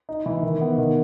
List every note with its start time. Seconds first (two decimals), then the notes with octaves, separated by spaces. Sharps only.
0.09 D#4
0.26 E3
0.43 D#3
0.61 B3
0.78 D#3